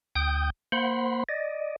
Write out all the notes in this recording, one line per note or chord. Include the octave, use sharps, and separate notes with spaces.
D2 G5 D#6 G6
A#3 C5 F#5 B5 C6
D5 D#5